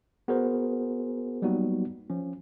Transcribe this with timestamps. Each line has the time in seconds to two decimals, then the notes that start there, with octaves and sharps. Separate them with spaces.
0.28 B3 F#4 G#4 A#4 C5
1.42 F#3 G3 A#3 B3 D#4 F#4
2.10 F3 C#4